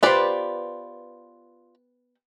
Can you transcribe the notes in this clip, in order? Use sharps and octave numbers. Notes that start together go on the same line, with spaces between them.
B3 F4 G4 B4 C5 D5